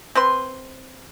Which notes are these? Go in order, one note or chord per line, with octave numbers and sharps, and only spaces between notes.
C4 B4 C6